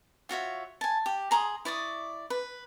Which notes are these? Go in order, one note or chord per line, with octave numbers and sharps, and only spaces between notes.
F4 F#4 C#5 E5
G#5 A5
G4
G#4 A#5 C6 D#6
E4 D5 C#6 D#6
B4